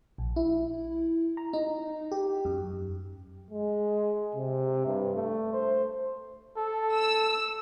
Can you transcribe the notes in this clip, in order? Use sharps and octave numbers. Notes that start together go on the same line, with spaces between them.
A#1
E4
A#5
D#4
G4
F#2
G#3
C3
G2
A3
C5
A4
E6